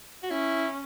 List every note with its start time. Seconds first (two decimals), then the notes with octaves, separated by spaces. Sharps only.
0.23 F#4
0.30 C#4 E4